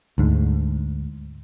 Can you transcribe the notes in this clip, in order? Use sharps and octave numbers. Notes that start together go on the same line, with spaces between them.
D2 G#2